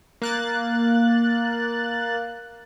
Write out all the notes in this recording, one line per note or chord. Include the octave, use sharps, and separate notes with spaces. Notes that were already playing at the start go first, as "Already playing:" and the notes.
A#3 F#6 A6